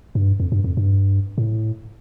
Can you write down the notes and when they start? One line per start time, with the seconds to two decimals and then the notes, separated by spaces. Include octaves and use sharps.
0.15 G2
0.40 F2
0.52 G2
0.64 F2
0.77 G2
1.38 A2